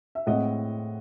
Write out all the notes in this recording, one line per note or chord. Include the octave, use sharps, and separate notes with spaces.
E5
A2 G#3 C4 D#5 F#5